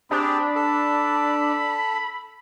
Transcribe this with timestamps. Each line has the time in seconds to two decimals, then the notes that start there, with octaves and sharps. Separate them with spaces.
0.11 C4 D4 G4 G#4 B5
0.55 A4